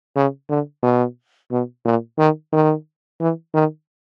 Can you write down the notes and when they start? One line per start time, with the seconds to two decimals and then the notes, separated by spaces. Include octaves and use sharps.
0.16 C#3
0.50 D3
0.83 B2
1.51 B2
1.85 A#2
2.19 D#3
2.53 D#3
3.21 E3
3.54 D#3